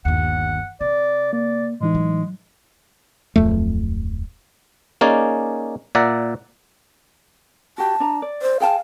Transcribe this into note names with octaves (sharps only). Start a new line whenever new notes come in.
G1 D#2 F#5
C3 D5
A#3 D5
A2 E3 G#3 D#4
F#3
D1 F2 A3
A#3 C#4 D#4 G#4 D5
A#2 D5 E5 F#5 A#5
F#4 G4 A5
D4 A#5
D5
C5
G#4 F5 G5 A5